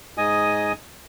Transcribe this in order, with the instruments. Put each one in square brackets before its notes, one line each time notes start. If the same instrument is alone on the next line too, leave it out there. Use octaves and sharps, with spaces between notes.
[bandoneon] G#2 D#5 G#5 D#6